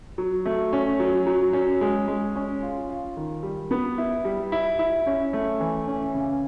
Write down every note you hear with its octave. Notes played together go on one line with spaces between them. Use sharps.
F#3
A3
C#4
F#3
F#3
C#4
G#3
G#3
C#4
F4
F4
D#3
G3
B3
E4
G3
E4
E4
C#4
A3
E3
C#4
C#3